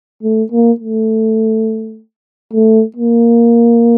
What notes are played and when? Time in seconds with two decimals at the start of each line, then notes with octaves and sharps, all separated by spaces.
0.23 A3
0.52 A#3
0.80 A3
2.53 A3
2.96 A#3